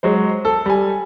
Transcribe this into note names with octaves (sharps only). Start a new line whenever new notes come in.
F#3 G#3 C5
A4
G3 G#5